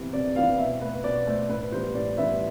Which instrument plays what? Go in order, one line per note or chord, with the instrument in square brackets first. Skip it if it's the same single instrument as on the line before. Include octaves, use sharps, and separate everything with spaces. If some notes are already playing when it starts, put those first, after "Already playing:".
Already playing: [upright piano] C3 E3 B3
C3 D5
E3 B3 F5
B2 E5
A3 B4
B2 D5
A3 C5
A2 B4
E3 G3 B3 C5
A2 D5
E3 G3 B3 E5